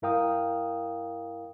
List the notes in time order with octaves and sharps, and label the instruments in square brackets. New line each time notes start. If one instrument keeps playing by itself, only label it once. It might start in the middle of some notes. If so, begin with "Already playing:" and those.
[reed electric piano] G2 E4 A#4 F5 G5 D#6